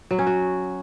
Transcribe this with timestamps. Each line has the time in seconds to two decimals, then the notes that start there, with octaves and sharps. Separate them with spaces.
0.11 F#3
0.19 C#4
0.27 F#4